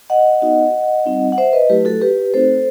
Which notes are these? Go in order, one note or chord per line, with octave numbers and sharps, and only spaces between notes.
D#5 F#5
B3 D#4 F#4
G3 C4 D#4 F#4
F#5
C5 E5
B4 D#5
F#3 A3 E4 G4 B4
F#4 A4
G4 B4
A3 C4 D#4 F#4 A4 C5